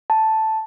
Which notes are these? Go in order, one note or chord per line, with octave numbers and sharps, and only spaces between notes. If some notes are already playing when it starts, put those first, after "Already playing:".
A5